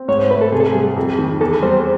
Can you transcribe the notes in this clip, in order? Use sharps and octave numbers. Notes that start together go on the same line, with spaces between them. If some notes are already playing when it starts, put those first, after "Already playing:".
Already playing: C4
G#2 C#5
C5
A3 B4
A4
C3 G#4
A4
G#4
G3
F2
D#3
E2 A4
G3 C5